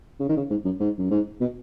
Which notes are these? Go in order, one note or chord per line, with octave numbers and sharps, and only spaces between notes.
C#3
D#3
C#3
G#2
F#2
G#2
F#2
G#2
B2